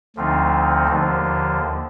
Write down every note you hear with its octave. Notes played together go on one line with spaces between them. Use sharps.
D2 D3 F3 C4 D#4
D#2 D3 F3